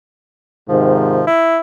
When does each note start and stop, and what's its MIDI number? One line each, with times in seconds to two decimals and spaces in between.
0.69 1.25 44
0.69 1.25 48
0.69 1.25 51
0.69 1.22 53
1.27 1.60 64